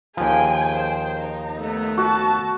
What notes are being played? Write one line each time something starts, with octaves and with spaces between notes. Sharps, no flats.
D#2 F3 G#4 G5 G#5
C5
D#4
A3 B3
F#4 A5